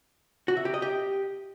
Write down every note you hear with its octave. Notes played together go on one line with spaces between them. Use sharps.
F#4
E5
G4
D#5
G4